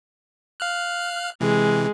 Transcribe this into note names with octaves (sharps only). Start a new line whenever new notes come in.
F5 F6 F#6
C3 E3 G#3